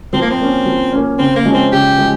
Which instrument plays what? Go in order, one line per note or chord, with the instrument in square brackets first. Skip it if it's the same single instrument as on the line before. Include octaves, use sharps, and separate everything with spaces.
[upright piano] F3 [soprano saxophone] C4
[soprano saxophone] A#3
C4
[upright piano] A#3 C#4
F3
A#3 C#4
[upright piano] C#3 [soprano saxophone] C4
[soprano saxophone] A#3
[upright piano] F3 G#3 C#4
[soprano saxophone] C4
[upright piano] C#3 [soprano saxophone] G4
[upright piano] F3 G#3